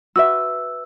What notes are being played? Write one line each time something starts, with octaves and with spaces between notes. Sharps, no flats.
F#4 B4 E5 E6